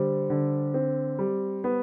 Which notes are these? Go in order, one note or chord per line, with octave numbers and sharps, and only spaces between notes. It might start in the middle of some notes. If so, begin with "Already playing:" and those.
Already playing: D3 G3 C5
D3
C4
G3
B3